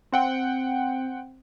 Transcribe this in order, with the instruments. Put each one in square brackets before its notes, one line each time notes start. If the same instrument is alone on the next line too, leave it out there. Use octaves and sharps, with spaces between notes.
[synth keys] C4 [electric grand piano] C5 F#5 G5